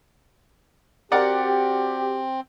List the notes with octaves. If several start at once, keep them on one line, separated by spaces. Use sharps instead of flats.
C4 F#4 G4 A#4 D5 F#5